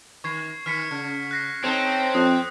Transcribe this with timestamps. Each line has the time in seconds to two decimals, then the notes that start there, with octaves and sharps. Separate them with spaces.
0.24 D#3 C#6 G#6 C7
0.66 D#3 F6 B6 C#7
0.91 C#3
1.31 F#6 A#6 C7
1.64 C4 D#4 A4 C#5
2.15 F2 D#6 F#6